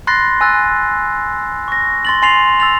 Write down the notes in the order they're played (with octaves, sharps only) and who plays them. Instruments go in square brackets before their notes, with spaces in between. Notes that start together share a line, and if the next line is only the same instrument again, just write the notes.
[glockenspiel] B5 C6 F#6 A6 A#6 C7
G#5 E6 F#6 A6
C#6 A#6
C6 A6 F#7
G#5 C6 A6 C7 F7
E6 A6 F7